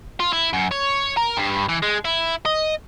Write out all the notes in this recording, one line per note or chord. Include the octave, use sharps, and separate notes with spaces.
F4
E4
F#2
C#5
A#4
G2
E3
G#3
E4
D#5